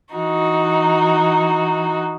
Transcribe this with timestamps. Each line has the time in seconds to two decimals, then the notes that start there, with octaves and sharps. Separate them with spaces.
0.16 E3 D#4 F#4